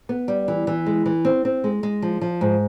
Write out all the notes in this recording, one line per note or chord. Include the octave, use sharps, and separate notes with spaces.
B3
G3
E3
E3
G#3
E3
C4
C4
G#3
G#3
F3
F3
G#2